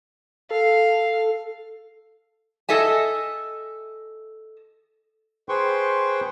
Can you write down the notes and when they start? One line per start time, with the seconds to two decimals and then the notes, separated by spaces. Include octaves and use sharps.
0.51 A4 F5
2.69 A4 D#5 E5 G#5
5.49 G#4 B4 C5 G5 C6 C#6